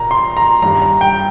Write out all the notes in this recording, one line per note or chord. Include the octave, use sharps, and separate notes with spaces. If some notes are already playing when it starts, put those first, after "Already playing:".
Already playing: A#2 A#5
C6
A#5
G2 D#3 G3 A#5
A#5
G5